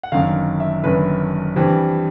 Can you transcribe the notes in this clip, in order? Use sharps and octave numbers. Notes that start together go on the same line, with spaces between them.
F#5
G1 F#2 D#3 F5
E5
G1 F#2 D#3 B4
G2 E3 G3 C4